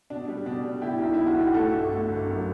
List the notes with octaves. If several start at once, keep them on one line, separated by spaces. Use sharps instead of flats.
B2 D4
G3
B2 D4
G3
B2 E4 G4
B1
B1 E4
F#4
B1 G4
A3 F#4 A4
G1
A3
G1
F#2